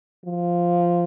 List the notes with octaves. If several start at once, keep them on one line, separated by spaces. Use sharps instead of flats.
F3